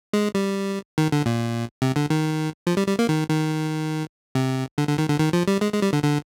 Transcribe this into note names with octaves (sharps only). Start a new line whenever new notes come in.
G#3
G3
D#3
D3
A#2
C3
D3
D#3
F3
G3
G3
A#3
D#3
D#3
C3
D3
D3
D#3
D3
D#3
F3
G3
G#3
G#3
G3
D3
D3